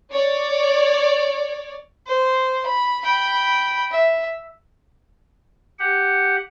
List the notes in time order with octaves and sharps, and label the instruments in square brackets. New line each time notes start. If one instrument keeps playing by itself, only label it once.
[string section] C#5 D5
[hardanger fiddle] C5
B5
G5 B5
E5
[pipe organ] G4 F#5